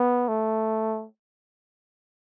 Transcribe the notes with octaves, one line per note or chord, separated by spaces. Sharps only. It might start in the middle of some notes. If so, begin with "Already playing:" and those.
Already playing: B3
A3